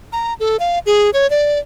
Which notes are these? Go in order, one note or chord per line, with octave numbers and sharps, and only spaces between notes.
A#5
A4
F5
G#4
C#5
D5